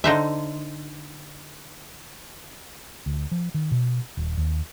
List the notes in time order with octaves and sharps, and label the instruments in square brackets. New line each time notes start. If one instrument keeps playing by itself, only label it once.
[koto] D3 D#4 C5 E5
[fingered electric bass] D2
F3
D#3
B2
D#1
D#2